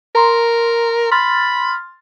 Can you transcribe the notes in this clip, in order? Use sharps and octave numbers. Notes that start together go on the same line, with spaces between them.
A#4 A#5 C6
B5 C6 F6 A6